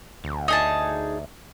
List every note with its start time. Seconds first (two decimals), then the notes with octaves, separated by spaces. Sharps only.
0.24 D2
0.48 D#4 G#4 A5